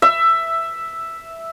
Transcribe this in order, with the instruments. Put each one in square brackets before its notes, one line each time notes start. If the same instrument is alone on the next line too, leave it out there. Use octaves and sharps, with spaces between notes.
[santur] E5